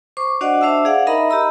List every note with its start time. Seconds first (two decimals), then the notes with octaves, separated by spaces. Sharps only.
0.17 C5 C#6 D6
0.41 D4 F#4 C5 D5 D#5 F#5
0.61 D4 C5 E5 A5 E6
0.85 G#4 D5 F5 F#5
1.07 D#4 A#4 D#5 E5 A#5 B5
1.30 G4 D#5 A#5 B5 E6